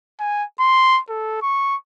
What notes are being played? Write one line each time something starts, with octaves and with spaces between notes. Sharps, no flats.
G#5
C6
A4
C#6